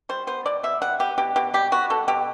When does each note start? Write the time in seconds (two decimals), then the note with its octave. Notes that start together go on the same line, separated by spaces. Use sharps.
0.09 G3 C5
0.27 B3 C5
0.45 B2 D5
0.63 B2 E5
0.82 G3 F#5
0.99 B3 G4
1.18 B2 G4
1.36 B2 G4
1.54 G3 G4
1.72 B3 F#4
1.90 B2 A4
2.08 B2 G4